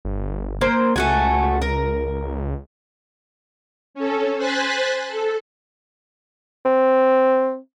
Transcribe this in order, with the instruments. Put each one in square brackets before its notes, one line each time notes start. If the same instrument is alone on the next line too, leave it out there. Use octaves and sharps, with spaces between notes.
[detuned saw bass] G1
[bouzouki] A#3 C5
[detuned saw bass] C#2 [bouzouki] A3 F#4 G#5
[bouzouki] A#4
[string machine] C#4 A4
C5 G#5 F#6 A6 B6
A4
[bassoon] C4